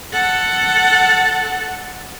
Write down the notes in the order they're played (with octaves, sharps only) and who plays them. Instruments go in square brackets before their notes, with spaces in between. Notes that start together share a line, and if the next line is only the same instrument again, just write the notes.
[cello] A4 F#5